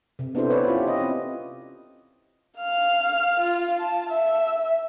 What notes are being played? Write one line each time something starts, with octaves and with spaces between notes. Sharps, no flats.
C3
B3 D4 E4 G4 A4 C5
B4 C#5 D5
C#4 E4 F4 G4
D#5
C4
F5 F6
F4
A5
E5